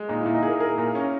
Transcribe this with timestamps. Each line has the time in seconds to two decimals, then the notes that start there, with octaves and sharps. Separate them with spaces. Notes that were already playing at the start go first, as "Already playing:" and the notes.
Already playing: G#3
0.09 A#2 D#4
0.21 A#2 E4
0.35 D#4
0.43 G#4 A#4
0.60 G#4 A#4
0.78 A#2
0.95 C#4